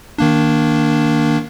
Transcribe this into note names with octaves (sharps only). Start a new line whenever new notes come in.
D#3 A#3 D4